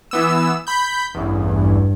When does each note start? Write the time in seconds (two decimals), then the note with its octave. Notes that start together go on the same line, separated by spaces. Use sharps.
0.11 E3 B3 E6
0.67 B5 G6
1.15 A1 E2 G2
1.47 G2